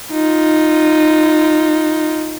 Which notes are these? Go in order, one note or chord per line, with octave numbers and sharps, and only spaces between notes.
D#4 F4